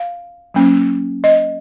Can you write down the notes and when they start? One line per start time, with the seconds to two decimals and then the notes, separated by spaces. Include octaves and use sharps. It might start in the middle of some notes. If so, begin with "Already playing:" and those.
Already playing: F5
0.54 F#3 A#3 C#4
1.24 D#5